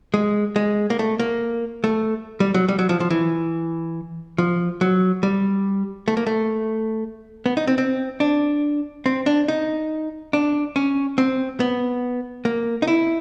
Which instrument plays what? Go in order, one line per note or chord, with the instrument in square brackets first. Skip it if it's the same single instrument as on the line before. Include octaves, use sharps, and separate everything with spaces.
[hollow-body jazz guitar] G#3
G#3
A#3
A3
A#3
A3
G3
F#3
G3
F#3
F3
F3
E3
F3
F#3
G3
A3
A#3
A3
B3
D#4
C4
C4
D4
C4
D4
D#4
D4
C#4
C4
B3
A#3
D#4
E4